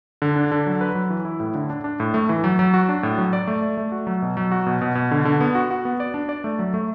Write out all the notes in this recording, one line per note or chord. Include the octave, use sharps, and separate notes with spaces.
D3
D4
D3
F#3
B4
F#3
E3
E4
A2
D3
D4
D4
A2
A3
E3
F#3
F#3
F#4
D4
A2
F#3
D5
A3
D5
A3
F#4
F#3
B2
F#3
F#4
B2
B2
B2
D3
D3
B3
F#4
F#4
B3
D5
D4
D5
A3
F#3
A3